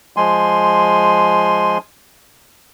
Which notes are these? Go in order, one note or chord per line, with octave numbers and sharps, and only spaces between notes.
F3 G#3 G#5 C6